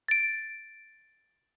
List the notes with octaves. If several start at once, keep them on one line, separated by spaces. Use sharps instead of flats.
A6 D7